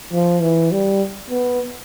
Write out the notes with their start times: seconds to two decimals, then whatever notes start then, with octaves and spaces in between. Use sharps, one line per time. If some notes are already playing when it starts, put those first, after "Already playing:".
0.13 F3
0.42 E3
0.72 G3
1.30 B3